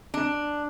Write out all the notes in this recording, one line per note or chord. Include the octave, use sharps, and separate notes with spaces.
D4